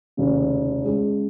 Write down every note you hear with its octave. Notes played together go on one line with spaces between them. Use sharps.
F1 D#2 C#3
C#2 C#3 G#3